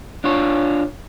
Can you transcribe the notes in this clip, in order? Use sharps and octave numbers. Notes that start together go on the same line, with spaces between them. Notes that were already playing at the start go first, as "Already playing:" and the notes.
D4 F4 C#5